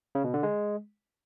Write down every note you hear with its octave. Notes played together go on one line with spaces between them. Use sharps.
C#3
B2
D3
G#3